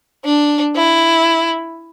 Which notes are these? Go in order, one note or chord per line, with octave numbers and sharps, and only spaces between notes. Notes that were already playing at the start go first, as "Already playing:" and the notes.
D4
E4